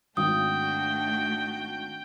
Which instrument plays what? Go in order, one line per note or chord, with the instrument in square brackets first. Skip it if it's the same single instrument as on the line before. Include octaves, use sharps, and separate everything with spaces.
[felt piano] G#1 [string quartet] A3 D4 F#4 [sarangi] G5 [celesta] D#6